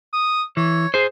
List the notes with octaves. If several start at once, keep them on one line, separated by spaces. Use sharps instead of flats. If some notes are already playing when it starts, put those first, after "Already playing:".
D#6
E3 C#5
G#4 C5